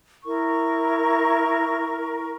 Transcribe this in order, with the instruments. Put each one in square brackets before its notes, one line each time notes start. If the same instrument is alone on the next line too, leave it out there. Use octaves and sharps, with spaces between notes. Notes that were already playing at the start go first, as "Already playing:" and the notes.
[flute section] E4 A#4 C#6